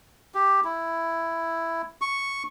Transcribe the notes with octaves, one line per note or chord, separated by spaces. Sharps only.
G4
E4
C#6